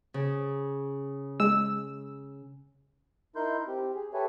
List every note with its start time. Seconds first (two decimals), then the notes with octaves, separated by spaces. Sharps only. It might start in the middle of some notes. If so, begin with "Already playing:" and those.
0.14 C#3
1.40 G#3 E6
3.36 D#4 E4 A#4 C6 G6
3.67 C4 G4
3.95 G#4
4.13 G4 A4 B4 C#5 E5 G#5